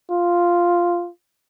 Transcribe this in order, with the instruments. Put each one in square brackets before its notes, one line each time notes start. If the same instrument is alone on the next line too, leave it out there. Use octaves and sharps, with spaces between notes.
[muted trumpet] F4